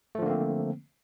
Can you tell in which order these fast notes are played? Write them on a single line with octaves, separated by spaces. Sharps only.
A3 F3 D3 A#3 C4